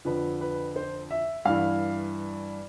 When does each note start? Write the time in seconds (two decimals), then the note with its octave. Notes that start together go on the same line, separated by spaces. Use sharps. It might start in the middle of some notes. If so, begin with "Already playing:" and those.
0.05 F2 D3 F3 B4
0.41 B4
0.76 C5
1.11 E5
1.45 G2 E3 F5